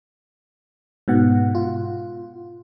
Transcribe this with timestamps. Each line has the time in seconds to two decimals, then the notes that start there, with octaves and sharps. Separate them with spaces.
1.08 G#2 B2 F#5
1.55 F4